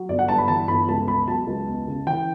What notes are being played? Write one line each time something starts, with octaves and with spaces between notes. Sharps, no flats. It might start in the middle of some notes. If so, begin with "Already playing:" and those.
Already playing: F#3
G1 D5
F#5
G2 A5
B5
E3 A5
G1 B5
C#2 A5
B2 B5
F#3 A5
C#2
E2
C#3
E3 G5